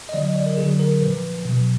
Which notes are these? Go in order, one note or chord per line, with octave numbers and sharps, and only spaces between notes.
D#5
D3 F#3 D5
D#5
D5
A#4
D3 F#3 G#4
A#4
A#2 F3 B4
B2 F#3